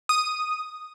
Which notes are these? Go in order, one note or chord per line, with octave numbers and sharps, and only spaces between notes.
D#6